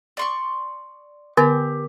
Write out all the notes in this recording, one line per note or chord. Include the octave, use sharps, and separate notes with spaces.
D5 C6 C#6
D3 B3 G4 A#4